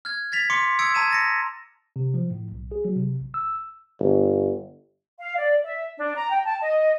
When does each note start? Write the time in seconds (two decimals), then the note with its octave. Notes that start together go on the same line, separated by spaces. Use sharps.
0.05 F6 G#6
0.32 G#6 A6 B6 F7
0.50 C6 D6 B6 C#7
0.79 D#6 E6 G#6 C#7 D7
0.94 A5 A#5 G#6 D#7 E7
1.11 A6 A#6 C#7
1.96 C3
2.14 F3
2.31 A2
2.52 B1
2.72 G#4
2.85 F#3
2.96 C3
3.21 A1
3.34 E6
4.00 G1
5.19 F5
5.38 D5
5.64 E5
5.98 D4
6.15 A#5
6.30 G5
6.44 A5
6.62 D#5